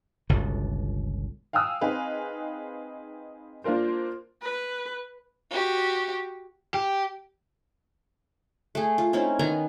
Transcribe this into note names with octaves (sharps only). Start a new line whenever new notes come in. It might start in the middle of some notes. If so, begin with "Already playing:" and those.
G1 C#2 B2 D3
F5 G5 G#5 D#6 E6
C4 D#4 G#4 B4 F5
A#3 D4 F4 A#4 C5
B4
F#4 G4
G4
A3 G#4
F4
C4 C#4 D#4 E4
D#3 B3 G#5 A#5